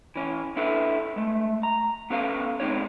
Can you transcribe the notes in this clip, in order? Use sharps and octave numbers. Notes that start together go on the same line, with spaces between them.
E3 C#4
D4 E4 A4 B4
G#3 A3
A#5
B3 C#4 A4 B4 F5
G#2 G#3 C4 D#4 C#5